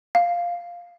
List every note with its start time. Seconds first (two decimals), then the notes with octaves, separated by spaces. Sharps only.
0.15 F5